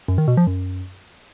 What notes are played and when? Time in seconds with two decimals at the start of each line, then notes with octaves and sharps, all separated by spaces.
0.08 F#2
0.18 D#3
0.28 B2
0.37 F3
0.47 F#2